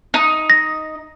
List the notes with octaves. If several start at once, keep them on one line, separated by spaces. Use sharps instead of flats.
D#4
A#6